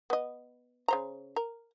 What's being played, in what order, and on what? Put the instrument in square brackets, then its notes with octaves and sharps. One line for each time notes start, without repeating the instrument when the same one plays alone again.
[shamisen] B3 D#5
C#3 C5 A#5
A#4